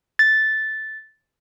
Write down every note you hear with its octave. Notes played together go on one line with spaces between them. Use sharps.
A6